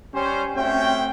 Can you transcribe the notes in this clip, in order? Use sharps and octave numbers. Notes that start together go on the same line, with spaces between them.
G3 C#4 C5
A3 C4 C#4 F#4 E5 G5